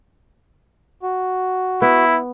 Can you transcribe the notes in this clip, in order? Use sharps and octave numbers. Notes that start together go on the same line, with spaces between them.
F#4
B3 E4